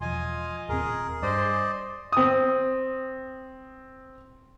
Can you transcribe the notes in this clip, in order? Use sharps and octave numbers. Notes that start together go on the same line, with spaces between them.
E1 F3 F4 D#5 G#5
D#1 A#2 C4 G#4 A#4
G2 C5 D5 D#5
C4 D#6